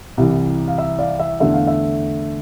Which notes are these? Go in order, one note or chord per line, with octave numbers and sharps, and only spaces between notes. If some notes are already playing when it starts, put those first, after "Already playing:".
C2 C3 E3
F5
E5
D5 F5
E5
E2 D3 A3 E5
F5
E5